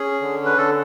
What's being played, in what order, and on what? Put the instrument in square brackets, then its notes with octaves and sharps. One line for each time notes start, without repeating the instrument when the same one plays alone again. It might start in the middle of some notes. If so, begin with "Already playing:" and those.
Already playing: [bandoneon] C#4 G#4
D3
B4
D3 A4